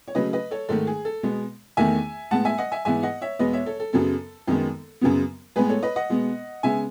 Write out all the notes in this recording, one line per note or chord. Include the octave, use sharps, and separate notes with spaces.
C#5
C#3 F#3 A3 B4 D#5
B4 D#5
A4 C#5
G#2 D#3 A3 A4
G#4
A4
B2 G#3 B3
E2 D#3 A3 E5 G#5
A2 G#3 B3 F#5 A5
E5 G#5
D#5 F#5
E5 G#5
G#2 E3 B3 E5 G#5
D#5 F#5
C#5 E5
E2 B2 G#3 B3 B4 D#5
C#5 E5
A4 C#5
A4
F#2 C#3 F#3 B3 A4
F#2 D#3 G#3 B3
F#2 C#3 F#3 B3
A2 G#3 B3 G#4 B4
A4 C#5
B4 D#5
D#5 F#5
B2 G#3 B3
C#3 G#3 B3 E5 G#5